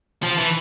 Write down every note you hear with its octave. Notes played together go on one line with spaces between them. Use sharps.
F3
E3